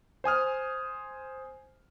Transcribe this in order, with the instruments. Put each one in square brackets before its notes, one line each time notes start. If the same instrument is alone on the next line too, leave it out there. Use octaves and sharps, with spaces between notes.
[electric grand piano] C5 G#5 D#6 F6